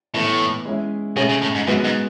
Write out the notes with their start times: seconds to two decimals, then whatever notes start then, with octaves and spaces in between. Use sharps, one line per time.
0.14 A2 E3 B3 E4
0.65 G#3 C#4 E4
1.16 B2 A3 C#4 G#4
1.29 C#3
1.42 A2
1.54 G#2
1.67 F#2 G#3 B3 F#4 B4
1.84 G#2